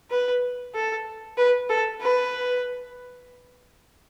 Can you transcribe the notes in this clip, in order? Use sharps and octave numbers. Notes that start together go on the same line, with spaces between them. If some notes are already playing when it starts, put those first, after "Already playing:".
B4
A4
B4
A4
B4